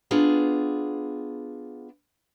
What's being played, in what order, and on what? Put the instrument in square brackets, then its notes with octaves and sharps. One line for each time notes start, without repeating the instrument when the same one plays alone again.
[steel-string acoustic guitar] B3 D4 F4 G#4